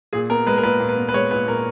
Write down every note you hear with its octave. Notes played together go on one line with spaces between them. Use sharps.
A#2 G#4
B3 A#4
G#3 B4
A#4
A#2 B4
A#2
B4
B3
B4
G#3 C#5
A#2 B4
A#2 A#4